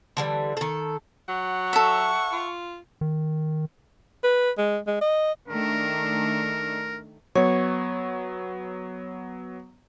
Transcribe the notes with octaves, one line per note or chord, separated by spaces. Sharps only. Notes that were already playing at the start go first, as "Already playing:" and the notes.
D3 E3 G3
D#3 A4
F#3 F#5
A4 E5 C#6
F4
D#3
B4
G#3
G#3
D#5
D#3 A3 D4 A#4
F#3 B3 C#5